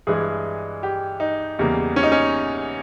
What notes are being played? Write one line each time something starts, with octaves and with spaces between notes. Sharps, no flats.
G2 E3 G#3 G#4
G4
D#4
E2 C#3 G3 A#3
C#4
D#4
C#4